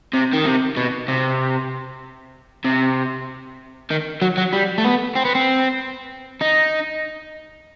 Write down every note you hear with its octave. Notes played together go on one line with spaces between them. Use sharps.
C3
D#3
C3
B2
C3
C3
D#3
F#3
F#3
G3
A3
B3
C4
B3
C4
D#4